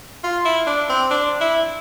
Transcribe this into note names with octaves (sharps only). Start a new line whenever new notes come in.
F4
E4
D4
C4
D4
E4